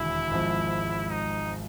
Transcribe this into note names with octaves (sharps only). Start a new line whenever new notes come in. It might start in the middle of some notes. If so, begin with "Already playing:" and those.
Already playing: E1 D#2 D3 E4
G#1 G#2 F3
D#4